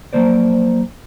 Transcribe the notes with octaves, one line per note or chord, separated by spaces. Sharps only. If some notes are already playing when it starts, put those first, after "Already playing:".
F3 F#3 A#3 C5 D5